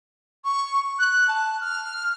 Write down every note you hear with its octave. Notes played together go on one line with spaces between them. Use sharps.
C#6
F#6
A5
F6